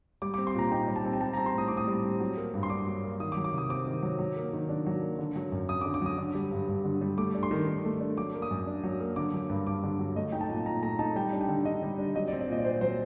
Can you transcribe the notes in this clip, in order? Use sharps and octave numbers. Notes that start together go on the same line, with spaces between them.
G3 D6
D6
C4
C6
A#2 A#5
D#4 G5
G3
A5
C4
G5
G3 A5
A#5
C4
C6
A2 D#6
A2 D6
D#6
G3
C4
F#3
A#3
G2
C6
D4 D6
F#3
A#3
D#3 D#6
D6
F#3
D6
C3 D#6
C4 D6
D#3
F#3
F#3
A#3
D#3
D4
F#3
A#3
D3
F#3
F#2
F#2 D#6
D6
D3
D6
F#3 D#6
D3
G3
G2
G2
D3
G3
A3 D6
D4
C6
D#3
D#3
A3
D4
F#3 D6
A#3
D#6
F#2
D4
F#3
A#3
D3 D6
F#3
G2
G2 D6
D3
F#3
A3 D#5
D#4 G5
A5
A#2
A#2 A#5
A3 A#5
D#4 A5
G3 G5
D4
G5
D3
D3 D#5
G3
D4
F#3 D#5
D5
C4
D5
A#2 D#5
D5
A#2 C5
F#3 C5